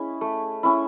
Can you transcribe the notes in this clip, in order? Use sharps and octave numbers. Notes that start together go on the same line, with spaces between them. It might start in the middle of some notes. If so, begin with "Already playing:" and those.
Already playing: G#3 C#4 E4 G#4
A3
C#4 E4